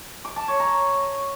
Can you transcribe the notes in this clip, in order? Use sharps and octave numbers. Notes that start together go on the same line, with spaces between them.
D6
A5
C#5
A#5